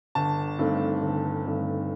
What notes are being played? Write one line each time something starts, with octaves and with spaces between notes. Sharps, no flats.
G1 A5
G2 D#3 A3 C4
G1
G2 D#3 A3 C4